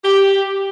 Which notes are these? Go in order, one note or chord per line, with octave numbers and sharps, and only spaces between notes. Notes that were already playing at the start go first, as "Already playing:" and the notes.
G4